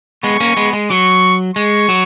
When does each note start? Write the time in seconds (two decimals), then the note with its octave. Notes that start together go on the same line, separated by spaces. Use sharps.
0.23 G#3 B3 C#6
0.40 A#3 C#4
0.57 G#3 B3
0.73 G#3
0.90 F#3 C#6
1.56 G#3 C#6
1.89 F#3